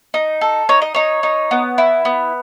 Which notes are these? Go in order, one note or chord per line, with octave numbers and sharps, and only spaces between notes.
D#4
A4
D#4 C#5
D#5
D#4 C#5
D#4
B3
E4
B3